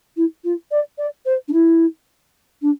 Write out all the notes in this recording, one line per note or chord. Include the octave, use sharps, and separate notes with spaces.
E4
F4
D5
D5
C5
D4
E4
D4